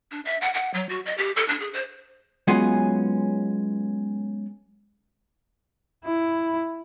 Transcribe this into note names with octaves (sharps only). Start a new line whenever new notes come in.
D4
E5
F#5
F#5
F#3
F#4
D#5
G4
A4
D4
G#4
C5
F#3 G#3 B3 C#4 F4 G#4
E4